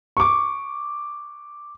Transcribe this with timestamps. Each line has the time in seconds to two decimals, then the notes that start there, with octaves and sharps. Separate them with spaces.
0.17 C#6 D6